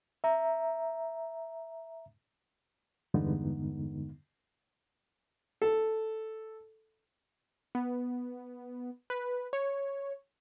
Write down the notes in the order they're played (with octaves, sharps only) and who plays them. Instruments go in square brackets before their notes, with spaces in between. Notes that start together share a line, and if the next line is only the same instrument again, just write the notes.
[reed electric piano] E5 A#5
E2 G2 D3 G#3 B3 D#4
[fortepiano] A4
[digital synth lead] B3
B4
C#5